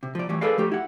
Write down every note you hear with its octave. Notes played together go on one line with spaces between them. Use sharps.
C3
F3 D5
A2 E3 G3
G#4 A4 B4 D5 F5
F3 A3 G4
E4 F#5